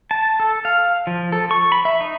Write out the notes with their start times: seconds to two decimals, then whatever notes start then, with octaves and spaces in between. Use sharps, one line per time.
0.11 A5
0.40 A4
0.65 F5
1.07 F3
1.32 A4
1.51 C#6
1.72 B5
1.85 E5
2.01 D#4